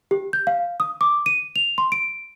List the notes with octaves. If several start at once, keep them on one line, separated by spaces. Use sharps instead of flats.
G4
G6
F5
D#6
D6
D#7
F7
C6
D7